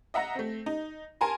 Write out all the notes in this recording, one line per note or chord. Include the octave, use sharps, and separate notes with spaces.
D#5 E5 F#5 A#5 A#6
A3 C4
D#4
A#4 G#5 A5 C6